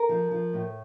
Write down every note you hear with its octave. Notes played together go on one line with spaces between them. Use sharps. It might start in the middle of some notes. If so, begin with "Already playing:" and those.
Already playing: A#4
F3
F3
A2